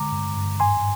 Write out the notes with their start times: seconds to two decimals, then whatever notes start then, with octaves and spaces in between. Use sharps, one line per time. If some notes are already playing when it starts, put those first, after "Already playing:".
Already playing: D3 G#3 A#5 D6
0.12 G2
0.37 G2
0.60 G#2 G#5 C6